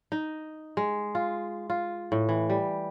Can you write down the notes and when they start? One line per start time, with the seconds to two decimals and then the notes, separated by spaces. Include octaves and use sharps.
0.12 D#4
0.77 G#3
1.15 F4
1.70 F4
2.12 A2
2.29 E3
2.49 G3